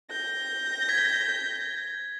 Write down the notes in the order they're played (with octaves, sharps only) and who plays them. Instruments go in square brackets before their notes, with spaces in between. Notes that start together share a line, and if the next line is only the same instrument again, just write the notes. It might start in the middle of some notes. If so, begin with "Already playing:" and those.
[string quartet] G6 A#6
[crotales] G#6 B6